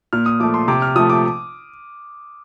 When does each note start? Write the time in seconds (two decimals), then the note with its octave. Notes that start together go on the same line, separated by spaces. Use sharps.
0.13 A#2 F6
0.26 D#6
0.40 F3 A3 D6
0.54 C6
0.68 C3 D6
0.82 F6
0.96 F3 A3 D#6
1.10 D6